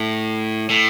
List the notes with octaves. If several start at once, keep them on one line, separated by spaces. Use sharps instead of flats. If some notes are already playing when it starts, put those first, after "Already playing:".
Already playing: A2
A2